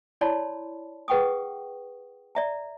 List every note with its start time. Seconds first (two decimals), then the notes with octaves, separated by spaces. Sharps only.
0.21 E4 C#5 D5 A5 B5 C6
1.08 G#4 B4 F#5 G5 C#6 D#6
2.35 D5 E5 A#5